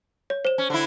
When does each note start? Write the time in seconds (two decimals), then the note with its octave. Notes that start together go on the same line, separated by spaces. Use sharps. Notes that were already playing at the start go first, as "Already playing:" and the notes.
0.30 C#5
0.45 C5 E7
0.58 C#4
0.70 D3 E4